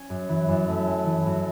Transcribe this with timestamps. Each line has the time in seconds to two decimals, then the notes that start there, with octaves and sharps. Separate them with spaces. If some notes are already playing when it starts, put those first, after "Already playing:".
Already playing: C#4
0.10 F#2
0.29 E3
0.49 F#2
0.68 A3
0.87 C#4
1.06 E3
1.26 F#2